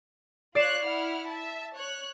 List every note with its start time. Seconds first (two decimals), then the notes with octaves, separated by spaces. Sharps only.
0.55 F4 C#5 D5 F#6 C7 E7
0.85 E4 F#5 F6
1.28 E5 A5
1.75 C#5 F#6